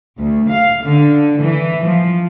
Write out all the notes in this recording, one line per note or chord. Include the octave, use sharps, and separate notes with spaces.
D2
F5
D3
E3
F3